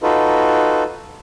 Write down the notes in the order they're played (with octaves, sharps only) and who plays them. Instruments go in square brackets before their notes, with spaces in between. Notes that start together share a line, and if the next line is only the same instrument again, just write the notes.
[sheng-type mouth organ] D#4 F4 F#4 A4 B4